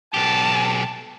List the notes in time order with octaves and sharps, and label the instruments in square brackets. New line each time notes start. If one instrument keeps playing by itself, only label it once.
[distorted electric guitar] B1 G4 [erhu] A5